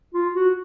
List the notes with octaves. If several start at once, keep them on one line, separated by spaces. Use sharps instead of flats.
F4
F#4